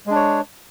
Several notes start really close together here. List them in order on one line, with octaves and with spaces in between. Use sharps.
G#3 D4 C#5